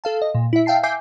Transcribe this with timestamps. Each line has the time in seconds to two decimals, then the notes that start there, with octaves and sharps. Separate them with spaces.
0.04 A4 F5 A5
0.22 D#5
0.35 A#2
0.53 E4 E5
0.66 E5 F5 G5 A5 C7
0.83 E5 G#5 D6 G6 C7